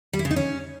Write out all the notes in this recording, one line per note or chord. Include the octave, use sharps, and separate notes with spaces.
G3
E4
C#3
D#4
C#4